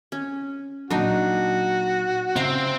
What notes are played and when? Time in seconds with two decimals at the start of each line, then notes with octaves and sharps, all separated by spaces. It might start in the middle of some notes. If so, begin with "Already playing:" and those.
0.12 C#4
0.90 A#2 F#3 D4 D#4 F#4
2.36 C#3 C4 E5 F5 A#5